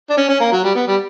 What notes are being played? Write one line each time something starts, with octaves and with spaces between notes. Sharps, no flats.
D4
C#4
C#4
A#3
F#3
G3
B3
G3